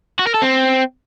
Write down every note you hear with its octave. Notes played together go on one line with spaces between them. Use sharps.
F#4
A#4
A4
C4